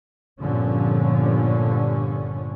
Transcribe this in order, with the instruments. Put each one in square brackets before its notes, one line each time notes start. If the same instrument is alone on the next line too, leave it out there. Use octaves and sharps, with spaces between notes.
[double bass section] G1 G2 A#2 D3 F3 C#4